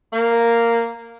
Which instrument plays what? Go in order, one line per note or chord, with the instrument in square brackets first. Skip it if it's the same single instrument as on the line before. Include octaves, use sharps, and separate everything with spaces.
[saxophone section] A#3